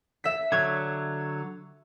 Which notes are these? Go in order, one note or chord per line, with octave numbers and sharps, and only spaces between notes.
E5 B6
D3 F#3 C#5 G#6